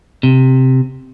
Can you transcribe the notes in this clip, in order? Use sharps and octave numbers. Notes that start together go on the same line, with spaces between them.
C3